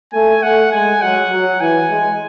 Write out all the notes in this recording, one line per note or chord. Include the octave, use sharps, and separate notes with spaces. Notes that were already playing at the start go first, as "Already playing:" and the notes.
A3 G#5
A3 F#5
G#3 G#5
F#3 F#5
F#3
E3 G#5
G#3